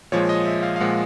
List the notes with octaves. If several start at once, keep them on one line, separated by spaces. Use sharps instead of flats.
A#2 F3 G#3 C#5
D#5
E5
F5
F5
A#2 F3 G#3 F#5